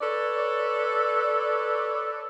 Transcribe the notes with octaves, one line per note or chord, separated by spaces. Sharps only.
A4 B4 C#5 D5